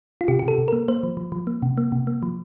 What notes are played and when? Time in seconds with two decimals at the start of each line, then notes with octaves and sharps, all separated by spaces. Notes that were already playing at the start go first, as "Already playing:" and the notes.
0.21 F4
0.28 C3 G4
0.39 C3 G4
0.48 A4
0.58 C3
0.68 A#3 A#4
0.88 A#3 C5
1.03 F3
1.17 F3
1.32 F3
1.47 A#3
1.62 C3
1.78 A#3
1.92 C3
2.07 A#3
2.23 F3